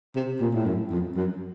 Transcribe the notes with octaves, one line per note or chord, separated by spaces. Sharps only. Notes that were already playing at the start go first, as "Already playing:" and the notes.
C3
A#2
A2
F#2
F2
F#2